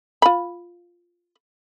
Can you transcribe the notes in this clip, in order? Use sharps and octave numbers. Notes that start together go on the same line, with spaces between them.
F4 B5